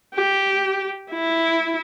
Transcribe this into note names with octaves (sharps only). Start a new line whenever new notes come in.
G4
E4